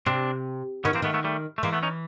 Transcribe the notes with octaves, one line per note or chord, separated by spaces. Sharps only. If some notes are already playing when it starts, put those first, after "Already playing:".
C3 C4 D4
D#3 B3 C#4
E3 A#3 C4
D#3 A3 B3
A3 B3
G3 A3
A3
E3 G#3 A#3
A3 B3
C#4 D#4